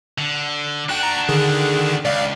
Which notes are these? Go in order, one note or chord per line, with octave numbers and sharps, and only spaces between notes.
D3
D4 F#4 G5 F#6
A#5
D3 D#3 G#4
C#2 D5 F5